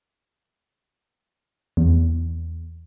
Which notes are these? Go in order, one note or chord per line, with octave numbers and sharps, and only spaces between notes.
E2